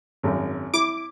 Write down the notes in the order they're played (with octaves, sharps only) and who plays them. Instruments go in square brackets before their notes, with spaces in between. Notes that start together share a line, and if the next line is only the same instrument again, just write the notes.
[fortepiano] G#1 F#2
[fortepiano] E4 [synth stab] D6